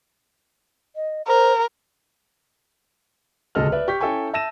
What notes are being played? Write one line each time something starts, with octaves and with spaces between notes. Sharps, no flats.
D#5
A#4 C5
D1 C#2 G#3 A4 D#5 F6
B4 D5 E5
G4 C#6 G6 B6
C#4 E4 A4 G5 G#5 C#6
E5 A5 E6 A#6 D#7 E7